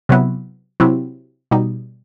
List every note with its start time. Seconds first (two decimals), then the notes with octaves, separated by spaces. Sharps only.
0.09 C3 F#3 B3 E4
0.80 C3 F#3 C4 E4
1.51 B2 G3 D#4